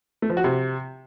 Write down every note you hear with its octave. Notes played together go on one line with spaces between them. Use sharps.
A3
F3
F#4
C3